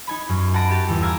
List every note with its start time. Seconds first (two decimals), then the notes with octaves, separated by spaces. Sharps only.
0.07 D#4 G#5 B5
0.29 F#2
0.54 F#5 A5 B5 A#6 D7 D#7
0.70 G4 A5 A6
0.87 G1 E2 A3 G4
1.02 F5 G#5 A#5 D6 E6 F6